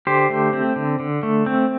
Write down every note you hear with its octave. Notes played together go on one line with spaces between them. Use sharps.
D3 G4 C5
A3
C4
D3
D3
A3
C4